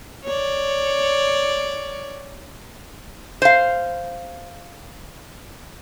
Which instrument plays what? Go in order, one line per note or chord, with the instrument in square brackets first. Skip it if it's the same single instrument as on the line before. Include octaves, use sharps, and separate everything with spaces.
[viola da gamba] C#5 D5
[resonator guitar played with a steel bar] C5 F5